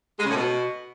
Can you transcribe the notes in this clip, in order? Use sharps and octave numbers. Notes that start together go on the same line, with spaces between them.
G#3
C#3
A2
B2